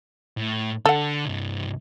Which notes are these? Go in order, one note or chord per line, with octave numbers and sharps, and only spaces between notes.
A2
D3 A4 F#5
C2 G2